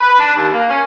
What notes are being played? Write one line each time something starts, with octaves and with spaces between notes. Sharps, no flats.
B4
D4
D#2
A#3
C#4